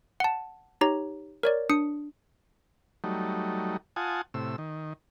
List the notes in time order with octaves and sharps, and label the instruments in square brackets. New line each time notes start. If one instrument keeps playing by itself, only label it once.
[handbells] F#5 A5
D#4 G4 C#5 A#5
A#4 C#5 D5
D4 D#6 C#7
[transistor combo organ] F#3 G3 A3 D#4
F4 F#5 G#5 A5 D#6
A2 C3 E6
D#3